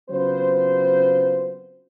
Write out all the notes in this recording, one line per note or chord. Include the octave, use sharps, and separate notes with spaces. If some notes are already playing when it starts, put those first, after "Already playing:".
C#3 F#3 B3 C4 F4 C5